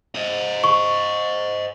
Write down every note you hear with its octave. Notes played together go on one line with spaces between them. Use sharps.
C5 D#5
C#6